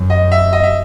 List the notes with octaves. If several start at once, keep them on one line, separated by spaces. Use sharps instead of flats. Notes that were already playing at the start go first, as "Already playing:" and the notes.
Already playing: F#2
D#5
E5
D#5
E5